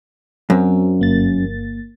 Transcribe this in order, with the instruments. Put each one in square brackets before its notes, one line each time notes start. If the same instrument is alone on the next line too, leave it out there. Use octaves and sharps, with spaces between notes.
[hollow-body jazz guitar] F#2 [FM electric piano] F#3 C4
[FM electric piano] G1 A#3 A6